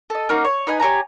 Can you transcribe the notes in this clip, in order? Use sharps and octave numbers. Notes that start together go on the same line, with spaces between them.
A4 D#5
A#3 C#4 D#4 F#4
C#5
D#4 B4 D#5 G#5
G4 C#5 G#5 A#5